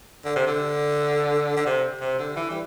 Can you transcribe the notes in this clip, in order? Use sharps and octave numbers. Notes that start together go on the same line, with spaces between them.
D3
C3
D3
D3
C3
C3
D3
E3
G3